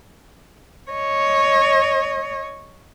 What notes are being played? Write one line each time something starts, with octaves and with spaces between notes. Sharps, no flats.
C#5 D#5